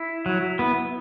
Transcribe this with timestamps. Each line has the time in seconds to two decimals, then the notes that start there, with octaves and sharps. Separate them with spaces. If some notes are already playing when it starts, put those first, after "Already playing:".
Already playing: E4
0.26 F#3
0.59 B3